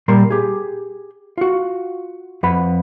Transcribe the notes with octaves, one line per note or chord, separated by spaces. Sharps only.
A#2 G3 A#4 C6
G4 G#4
F4 F#4
F2 B4 F#5 B5